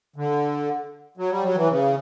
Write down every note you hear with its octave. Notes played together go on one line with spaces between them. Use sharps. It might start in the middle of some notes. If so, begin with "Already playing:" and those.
D3
F#3
G3
F#3
E3
C#3